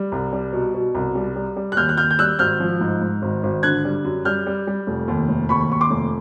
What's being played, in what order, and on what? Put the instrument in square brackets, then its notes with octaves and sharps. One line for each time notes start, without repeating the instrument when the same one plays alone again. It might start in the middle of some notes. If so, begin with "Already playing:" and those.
Already playing: [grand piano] G3
C2
G3
B2
B2
C2
G3
G3
G3
F#6
D#2 F6 G6
F#6
D#2 F6 G6
G6
G3 E6 F#6
G#1 F6 G6
F3
G#2
G#2
G#1
G#1
D3 F#6 G#6
G3
F#2
G3 F6 G6
G3
G3
F1
D#2
F1
D#2 B5 C#6
D#2 C#6
C6 D6
F1